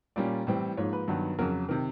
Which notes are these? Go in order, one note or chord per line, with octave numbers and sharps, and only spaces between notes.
A#2 G3 A#3 C#4 D5
A2 E3 G3 C4
G#2 F3 A#3 C#5
B4
G2 D#3 F#3 B3
F2 C#3 F#3 A#4
C3 D#3 A#4